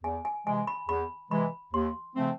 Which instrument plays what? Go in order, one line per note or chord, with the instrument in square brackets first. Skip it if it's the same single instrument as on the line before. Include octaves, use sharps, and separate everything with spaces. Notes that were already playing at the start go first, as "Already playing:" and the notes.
[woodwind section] E2 [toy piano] G#5
[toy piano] G#5
[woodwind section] C3 E3 G#3 [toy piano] G#5
[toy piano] B5
[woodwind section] E2 [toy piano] B5
[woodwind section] C3 E3 G#3 [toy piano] B5
[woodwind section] D#2 [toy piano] C6
[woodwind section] C#3 F3 A3 C4